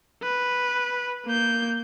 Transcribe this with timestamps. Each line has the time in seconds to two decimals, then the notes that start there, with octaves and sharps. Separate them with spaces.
0.22 B4
1.26 A#3 G6